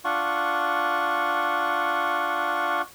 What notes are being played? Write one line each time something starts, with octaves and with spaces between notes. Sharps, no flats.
D4 F4 F#5 C#6